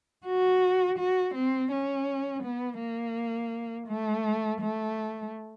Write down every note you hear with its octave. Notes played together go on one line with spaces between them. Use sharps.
F#4
F#4
C4
C#4
B3
A#3
A3
A3